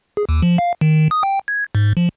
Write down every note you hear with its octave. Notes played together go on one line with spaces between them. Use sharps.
G#4
D#2
F3
F5
D#3
D#6
G5
G#6
G#2
F3